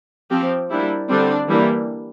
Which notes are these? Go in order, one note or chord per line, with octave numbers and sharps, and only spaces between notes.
F3 C4 G4
G3 A#3 D4 E4
D3 G3 C4 D4
E3 G3 A#3 D4